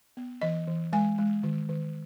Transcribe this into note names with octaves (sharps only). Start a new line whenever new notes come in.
B3
E3 D#5
E3
G#3 G#5
G#3
D#3
D#3